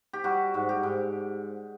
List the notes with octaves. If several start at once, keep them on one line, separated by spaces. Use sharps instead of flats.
G4
G3 F#4
G#2
G4
G#2